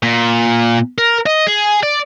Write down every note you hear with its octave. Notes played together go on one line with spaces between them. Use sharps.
A#2
A#4
D#5
G#4
D5